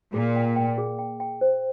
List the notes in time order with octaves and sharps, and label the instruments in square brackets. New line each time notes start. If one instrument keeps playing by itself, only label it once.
[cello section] A#2 [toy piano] G#4
[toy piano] G5
G5
G#4
G5
G5
C5